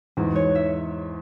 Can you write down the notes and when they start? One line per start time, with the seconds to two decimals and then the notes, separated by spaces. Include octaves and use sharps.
0.17 E2 G#2 F#4
0.36 C#5
0.55 E5